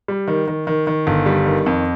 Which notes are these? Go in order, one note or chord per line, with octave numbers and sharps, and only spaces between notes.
G3
D#3
D#3
D#3
D#3
G1
G3
D#3
F2